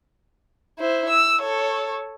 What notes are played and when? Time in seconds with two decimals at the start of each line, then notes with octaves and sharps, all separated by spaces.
0.79 E4 C5
1.09 E6
1.41 A4 C#5